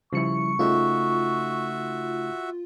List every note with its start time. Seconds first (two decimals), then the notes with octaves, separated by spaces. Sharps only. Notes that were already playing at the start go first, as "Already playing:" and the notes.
0.13 C#3 F3 G3 E4 C#6 C#7
0.59 C#3 A3 D#4 F4 F#4 E5